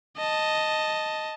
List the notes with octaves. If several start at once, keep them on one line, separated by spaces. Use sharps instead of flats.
D#5 A5